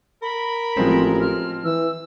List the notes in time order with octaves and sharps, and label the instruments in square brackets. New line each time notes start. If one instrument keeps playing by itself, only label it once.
[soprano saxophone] A#4 [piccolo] B5
[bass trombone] A1 [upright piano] F3 G#3 C4
[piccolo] F6
[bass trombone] E3 [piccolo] E6